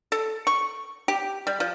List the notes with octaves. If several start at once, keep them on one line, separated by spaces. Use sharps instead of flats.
A4
C#6
G4
G3
F3